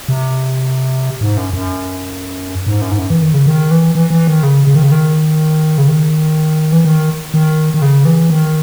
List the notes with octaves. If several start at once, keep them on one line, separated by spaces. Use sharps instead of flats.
C3
G#2
F#2
F#2
G#2
F#2
G#2
F#2
E3
D#3
C#3
D#3
E3
E3
E3
D#3
C#3
C#3
D#3
C#3
D#3
C#3
D#3
E3
D#3
D#3
D#3
C#3
E3
D#3